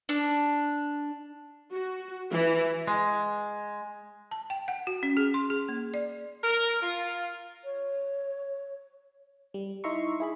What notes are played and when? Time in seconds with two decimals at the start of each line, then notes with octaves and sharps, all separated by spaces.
0.09 D4
1.72 F#4
2.31 E3
2.87 G#3
4.31 A5
4.50 G5
4.68 F#5
4.87 F#4
5.03 C#4
5.17 G#4
5.34 C6
5.50 G#4
5.69 A#3
5.94 D5
6.43 A#4
6.82 F4
7.65 C#5
9.54 G3
9.84 D#4 E4 E5 A#5 C6 C#6
10.20 E4 G#4 B5